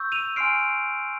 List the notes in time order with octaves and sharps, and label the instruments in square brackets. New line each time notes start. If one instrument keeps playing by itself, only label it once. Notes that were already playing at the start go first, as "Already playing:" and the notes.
Already playing: [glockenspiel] C#6 E6 G6
D#7 F7
G#5 C6 F6 C7 D7